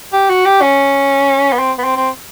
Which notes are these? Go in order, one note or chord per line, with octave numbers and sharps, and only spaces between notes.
G4
F#4
G4
C#4
B3
C4
B3
C4
C4